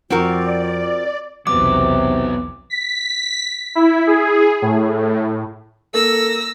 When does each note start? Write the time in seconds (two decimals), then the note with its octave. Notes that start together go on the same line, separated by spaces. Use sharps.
0.10 F2 C4 F4 F#4 A#4 D5
1.47 B1 E2 C3 F#3 B3 D6
2.70 B6
3.75 E4
4.07 G#4
4.62 A2
5.94 A#3 A4 E6 A#6